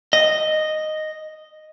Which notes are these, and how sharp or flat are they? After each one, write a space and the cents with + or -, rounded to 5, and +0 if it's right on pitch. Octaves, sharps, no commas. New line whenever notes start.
D#5 -5